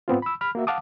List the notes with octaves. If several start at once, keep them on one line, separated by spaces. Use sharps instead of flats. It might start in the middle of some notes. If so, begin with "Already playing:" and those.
G#2 B3 C4 F4
B5 E6
B5 F6
A#3 F#4 E5
F5 F#5 A5 D6 D#6